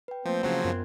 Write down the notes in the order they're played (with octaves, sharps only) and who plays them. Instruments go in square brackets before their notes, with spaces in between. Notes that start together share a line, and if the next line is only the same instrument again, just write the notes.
[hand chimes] B4 G5
[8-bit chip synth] F3 [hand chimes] A3 A#3 G6 [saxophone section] C4
[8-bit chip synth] C#3 F3 F#3 [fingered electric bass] A3 C#4 [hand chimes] C6 F#6 G#6
[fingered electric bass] F#2 [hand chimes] B3 F4 A#4